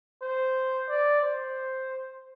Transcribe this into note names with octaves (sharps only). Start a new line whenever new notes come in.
C5
D5
C5